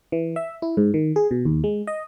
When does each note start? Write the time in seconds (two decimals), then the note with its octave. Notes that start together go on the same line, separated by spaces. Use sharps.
0.12 E3
0.36 E5
0.62 E4
0.77 G#2
0.94 D#3
1.16 G#4
1.31 B2
1.45 D#2
1.64 G#3
1.87 D#5